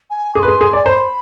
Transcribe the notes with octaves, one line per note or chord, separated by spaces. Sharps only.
G#5
G#4 D6
B4 C6
G#4
G#4
D5 G#5
C5 C6
B5